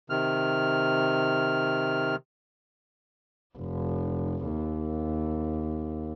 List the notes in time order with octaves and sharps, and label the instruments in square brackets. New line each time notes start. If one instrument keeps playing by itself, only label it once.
[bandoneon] C3 D#3 F6
[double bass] F1
D#2